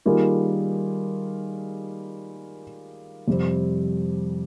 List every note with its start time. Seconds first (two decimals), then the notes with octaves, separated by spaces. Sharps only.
0.06 D#3 G3 A#3 F4 G#4
3.28 F2 C3 G3 C4